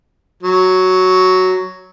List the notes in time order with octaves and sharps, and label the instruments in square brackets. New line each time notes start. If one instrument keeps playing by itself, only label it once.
[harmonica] F#3